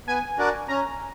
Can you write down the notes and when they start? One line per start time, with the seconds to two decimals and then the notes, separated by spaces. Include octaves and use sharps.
0.07 B3 G#5
0.38 D4 F#4 A#4 D5
0.68 C#4 A#5